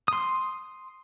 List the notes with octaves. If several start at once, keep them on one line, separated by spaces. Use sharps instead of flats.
C6 D#6